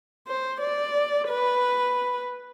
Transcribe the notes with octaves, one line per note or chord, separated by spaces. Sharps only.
C5
D5
B4